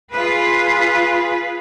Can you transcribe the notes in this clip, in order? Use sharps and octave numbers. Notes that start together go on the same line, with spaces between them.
F4 G#4 B4